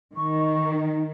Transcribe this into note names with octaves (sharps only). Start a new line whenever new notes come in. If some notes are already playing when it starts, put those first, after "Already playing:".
D#3 C#6
D#4